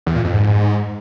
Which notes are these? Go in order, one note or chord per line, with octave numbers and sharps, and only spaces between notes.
E2
A#2
F2
G#2